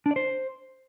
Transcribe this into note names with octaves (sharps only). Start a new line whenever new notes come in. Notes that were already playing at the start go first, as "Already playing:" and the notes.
D4
D5
C5